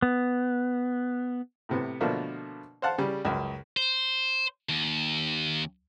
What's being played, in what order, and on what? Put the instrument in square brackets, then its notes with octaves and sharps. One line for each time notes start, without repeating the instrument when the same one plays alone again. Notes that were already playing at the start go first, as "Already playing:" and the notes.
[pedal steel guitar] B3
[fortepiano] A2 C3 B3
B2 D3 F3 A3 A#3 D4
C5 F5 F#5 A5
C#3 G3
C#2 F#2
[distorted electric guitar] C5
D#2